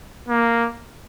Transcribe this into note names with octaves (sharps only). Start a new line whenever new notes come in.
A#3